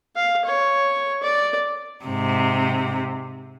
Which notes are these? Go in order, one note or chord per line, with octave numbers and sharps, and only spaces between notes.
F5
C#5
D5
G#2 C3